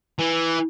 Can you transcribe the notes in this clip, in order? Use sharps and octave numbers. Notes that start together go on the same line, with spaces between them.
E3